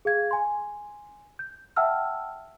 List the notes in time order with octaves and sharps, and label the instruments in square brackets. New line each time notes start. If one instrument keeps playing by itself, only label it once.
[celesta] G#4 F5 G#6
G#5 C6
G6
E5 F#5 G5 A5 E6 F6